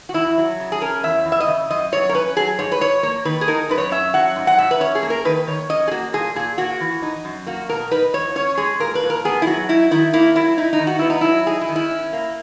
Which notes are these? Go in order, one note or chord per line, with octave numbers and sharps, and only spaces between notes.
F#4
E2 E4
F#3
C#3
G#4
C#4 A#4
E2 E5
E3
E5
D#5
C#3
F#2 D#5
F#2 C#5
A#4
C#4 B4
F#3 G#4
G#2 C#5
B4
G#2 C#5
A#3 C#5
D#3 B4
G#4
D#4 A#4
F#2 B4
C#5
C#4 E5
F#3 F#5
G#2
F#5
G#2 E5
B4
C#4 C#5
G#4
A#3
A#4
D#3 B4
D#3 C#5
C#4 D#5
G#4
A#3 F#4
A#2 G#4
A#2 G#4
A#3 F#4
E3
D#4
F#2
A#3 F#4
B2 A#4
D#4 B4
E2 C#5
C#4 C#5
G#3 G#4
A#2 A#4
B4
A#2
A#4
B3 G#4
E4
F#3 F#4
D#4 E4
D#3 E4
A#3 E4
F#3 E4
D#4 E4
D#4
D#3
F#4
B3 E4
D#4
F#3 E4
D#4 G#4
E4
D#3
E4
C#4
A#3